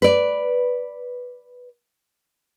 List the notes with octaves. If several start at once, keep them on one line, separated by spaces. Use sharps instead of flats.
B4 D5